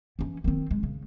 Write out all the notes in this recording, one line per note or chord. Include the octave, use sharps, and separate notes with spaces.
E3 C#4
D#3 C4
G#3
C#3